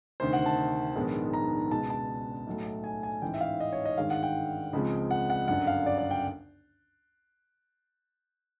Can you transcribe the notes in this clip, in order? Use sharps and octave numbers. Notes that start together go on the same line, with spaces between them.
D2 C3 D#3 C5
F#5
A5
A#1 G#2 D#3 G#3 B3
A#5
C#2 B2 G#3 B3 A5
A5
B1 A2 F#3 A3
G#5
G#5
A1 G#2 E3 G5
E5
F5
D#5
C#5
D#5
G#1 G2 D#3 G#3 F5
F#5
G5
C#2 C#3 F3 G#3 C4
F#5
F#5
G1 F#2 D3 F#5
F5
D5
D5
G5